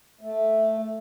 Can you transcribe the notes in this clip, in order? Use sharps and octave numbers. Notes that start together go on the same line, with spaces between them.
A3